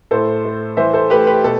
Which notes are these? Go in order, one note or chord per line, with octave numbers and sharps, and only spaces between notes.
A2 A4 C5
A3
E3 C5 E5
A4 C5
A3 G4 B4
G4 B4
B2 A4